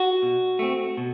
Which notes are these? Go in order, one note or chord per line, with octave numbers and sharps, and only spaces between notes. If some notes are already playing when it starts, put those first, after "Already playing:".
Already playing: F#4
B2
A3 C4
B2